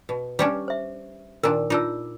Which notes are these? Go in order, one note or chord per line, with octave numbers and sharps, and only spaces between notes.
B2
G3 C#4 D4 G4 B4
C5 E5
A#2 D#3 D4 A#4
D4 D#4 F4 E6